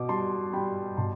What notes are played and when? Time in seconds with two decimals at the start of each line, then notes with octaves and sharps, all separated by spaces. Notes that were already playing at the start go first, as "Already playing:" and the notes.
Already playing: B2 D6
0.09 G3 A5 C6
0.53 G3 G5 B5
0.97 B2 A5 C6